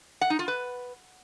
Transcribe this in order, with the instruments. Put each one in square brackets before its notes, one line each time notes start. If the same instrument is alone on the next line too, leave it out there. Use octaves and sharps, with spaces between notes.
[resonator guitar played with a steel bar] F#5
D#4
F4
B4